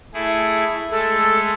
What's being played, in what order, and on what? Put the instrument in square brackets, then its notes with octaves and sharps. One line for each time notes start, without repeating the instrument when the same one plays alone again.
[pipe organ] A3 E4 G#4
[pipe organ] G#3 A3 [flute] A4